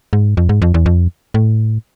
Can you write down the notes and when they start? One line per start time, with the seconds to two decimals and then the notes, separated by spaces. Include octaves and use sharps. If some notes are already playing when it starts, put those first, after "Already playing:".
0.13 G#2
0.37 F2
0.49 G#2
0.62 F2
0.74 E2
0.86 F2
1.34 A2